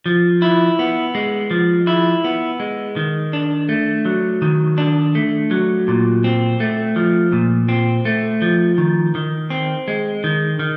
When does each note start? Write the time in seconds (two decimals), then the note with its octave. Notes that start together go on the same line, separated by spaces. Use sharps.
0.06 F3
0.42 E4
0.79 B3
1.15 G#3
1.51 F3
1.87 E4
2.24 B3
2.60 G#3
2.96 D#3
3.33 D4
3.69 A3
4.05 F#3
4.42 D#3
4.78 D4
5.15 A3
5.51 F#3
5.88 A#2
6.24 C4
6.60 A3
6.96 F3
7.32 A#2
7.69 C4
8.05 A3
8.42 F3
8.78 D#3
9.15 D#3
9.50 C4
9.88 G#3
10.24 D#3
10.59 D#3